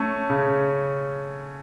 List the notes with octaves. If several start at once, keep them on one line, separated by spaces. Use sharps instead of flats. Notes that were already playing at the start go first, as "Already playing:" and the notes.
Already playing: A3 C#4
C#3